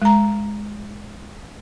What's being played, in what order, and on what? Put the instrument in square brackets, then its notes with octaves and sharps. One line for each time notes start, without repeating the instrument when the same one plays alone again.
[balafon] G#3 A#5